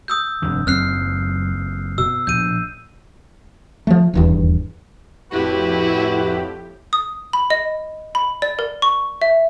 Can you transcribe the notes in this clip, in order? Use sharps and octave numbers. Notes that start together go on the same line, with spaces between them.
D#6 E6 G6
F1 G2 D3
F#1 F#2 C4 F6 F#6 C7
B2 E6
A#1 G6 D#7
F3 A3
D#1 E2 G2
F2 A2 E4 F#4 G4 B4
D#6
B5
D#5
B5
D5
A#4
C#6
E5